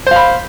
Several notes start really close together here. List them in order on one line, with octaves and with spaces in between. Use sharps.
C5 F5 B5